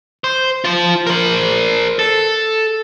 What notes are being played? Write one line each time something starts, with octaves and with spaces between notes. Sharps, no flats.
C5
F4 C5
A#4 C5
A4